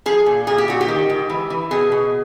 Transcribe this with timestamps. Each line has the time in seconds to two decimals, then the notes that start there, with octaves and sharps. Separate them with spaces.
0.06 F3 G#4
0.26 A#2
0.47 A#2 G#4
0.58 G4
0.68 A#2 F#4
0.81 G4
0.88 D#3
1.10 G#2
1.30 E3
1.50 E3
1.71 B2 G#4
1.92 B2